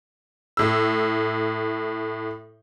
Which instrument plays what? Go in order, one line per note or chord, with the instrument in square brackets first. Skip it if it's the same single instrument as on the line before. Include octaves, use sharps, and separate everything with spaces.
[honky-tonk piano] A2 E6